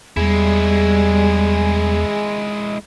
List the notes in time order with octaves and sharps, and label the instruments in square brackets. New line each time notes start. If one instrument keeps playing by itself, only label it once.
[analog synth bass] E2 [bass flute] G3 [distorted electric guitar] G#3 E4 [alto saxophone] G#4